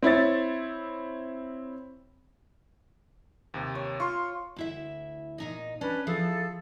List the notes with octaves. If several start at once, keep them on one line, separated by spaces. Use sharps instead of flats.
C4 E4 C#5 A6
D#2 C3
C#5
F4 C6 C#6
D2 E4 E5
A#2 D#4 D#5
C#4 D4 B4
F3 E4 G#4 A4